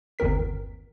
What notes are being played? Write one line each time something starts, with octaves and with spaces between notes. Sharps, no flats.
G1 D#2 C4 A#4 B6